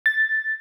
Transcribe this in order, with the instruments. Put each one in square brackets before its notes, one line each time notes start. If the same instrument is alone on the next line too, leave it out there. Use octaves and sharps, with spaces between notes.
[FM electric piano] A6